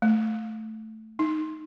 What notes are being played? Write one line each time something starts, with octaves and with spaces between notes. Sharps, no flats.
A3
D#4